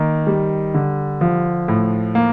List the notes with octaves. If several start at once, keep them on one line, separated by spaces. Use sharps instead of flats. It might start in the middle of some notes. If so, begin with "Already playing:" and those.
Already playing: D#3 A#3
G3
D3
F3
A2
A#3